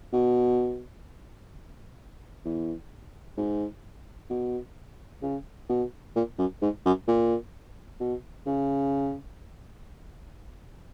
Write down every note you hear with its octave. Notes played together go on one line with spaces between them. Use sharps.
B2
E2
G#2
B2
C#3
B2
A#2
F#2
G#2
F#2
A#2
B2
C#3